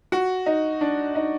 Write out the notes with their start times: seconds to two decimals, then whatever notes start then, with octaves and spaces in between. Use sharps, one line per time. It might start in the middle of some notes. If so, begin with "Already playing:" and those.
0.12 F#4
0.46 D#4
0.81 D4
1.15 D#4